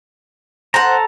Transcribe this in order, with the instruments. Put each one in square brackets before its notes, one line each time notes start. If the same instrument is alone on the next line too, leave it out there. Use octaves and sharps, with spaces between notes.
[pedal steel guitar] A4 A#5 [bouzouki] C5 F#5